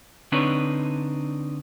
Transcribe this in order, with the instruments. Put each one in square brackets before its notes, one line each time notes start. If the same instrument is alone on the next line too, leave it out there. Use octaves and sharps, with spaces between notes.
[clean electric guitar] D3 C4 D4 D#4 B4 C#5